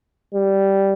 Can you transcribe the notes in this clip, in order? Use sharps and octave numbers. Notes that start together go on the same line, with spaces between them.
G3